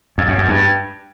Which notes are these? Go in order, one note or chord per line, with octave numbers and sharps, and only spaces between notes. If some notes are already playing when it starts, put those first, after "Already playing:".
F2
F#2
F#2
G2